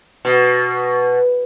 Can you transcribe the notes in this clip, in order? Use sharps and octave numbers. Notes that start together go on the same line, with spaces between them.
B2